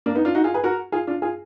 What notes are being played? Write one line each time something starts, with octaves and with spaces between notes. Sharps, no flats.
A#3 D4
B3 D#4
D4 F4
D#4 F#4
F4 G#4
G#4 B4
F#4 A#4
F4 G#4
D4 F4
F4 G#4